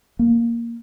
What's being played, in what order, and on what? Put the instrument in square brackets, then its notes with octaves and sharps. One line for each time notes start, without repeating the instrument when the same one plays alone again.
[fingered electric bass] A#3